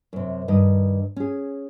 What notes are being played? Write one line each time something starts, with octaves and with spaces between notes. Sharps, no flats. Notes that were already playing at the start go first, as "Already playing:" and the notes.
F#2 C3
G2 D#3 D#5
C#4 G#4